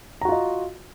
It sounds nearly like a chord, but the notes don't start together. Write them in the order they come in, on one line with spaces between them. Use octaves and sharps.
A#5 F#4 F4 D#5